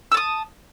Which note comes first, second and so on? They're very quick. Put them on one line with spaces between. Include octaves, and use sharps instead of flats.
E6 A5 D#6